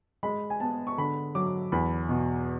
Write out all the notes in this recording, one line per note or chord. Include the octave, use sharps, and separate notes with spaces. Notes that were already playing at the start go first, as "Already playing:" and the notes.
G#3 B5
G#5
B3 A5
C#6
D3 B5
F#3 D6
E2 B5
B2